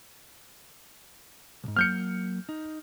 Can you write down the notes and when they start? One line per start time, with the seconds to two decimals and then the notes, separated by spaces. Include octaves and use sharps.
1.64 B1 G#2
1.76 F#3 A#3 F6 G6 C#7
2.49 D#4